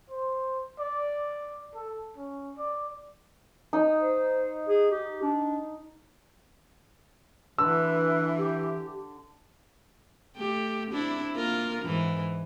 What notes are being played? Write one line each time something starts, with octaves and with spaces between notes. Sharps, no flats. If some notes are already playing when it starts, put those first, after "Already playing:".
C5
D5
A4
C#4
D5
D#4
C5
G#4
G4
D4
D3 E3 B4 E6
G4
A3 G4
C4 D4 E4
A#3 F4 A#4
G#2 E3